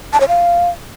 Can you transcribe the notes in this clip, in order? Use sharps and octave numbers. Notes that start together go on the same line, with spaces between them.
A5
C#5
F5